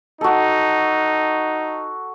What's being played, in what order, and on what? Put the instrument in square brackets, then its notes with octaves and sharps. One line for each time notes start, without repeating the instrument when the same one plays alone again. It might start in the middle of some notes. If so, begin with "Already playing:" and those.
[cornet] D#4 [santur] F#4 A4